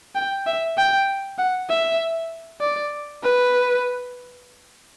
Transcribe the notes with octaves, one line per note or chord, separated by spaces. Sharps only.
G5
E5
G5
F#5
E5
D5
B4